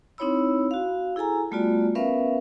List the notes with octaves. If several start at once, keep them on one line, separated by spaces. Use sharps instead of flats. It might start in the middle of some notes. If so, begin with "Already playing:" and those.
C4 D#4 E4 C#5 B5 E6
F#4 F5
E4 G#4 A4 G#5 A#5
G3 A3 B3 F4 F#4 D5
B3 C#4 A#4 B4 E5 F5